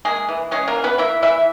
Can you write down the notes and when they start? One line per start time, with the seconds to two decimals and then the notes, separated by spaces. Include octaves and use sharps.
0.05 G#3 A#3 G#4
0.29 E3
0.51 G#3 C#4 G#4
0.67 A#3 A#4
0.75 E3
0.84 B3 B4
0.98 A#3 E4 E5
1.22 E3 E4 E5